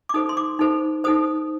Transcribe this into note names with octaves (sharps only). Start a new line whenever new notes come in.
D6
D#4 A4 C5 D#6
C6
D6
D#4 A4 C5
D#4 A4 C5 D#6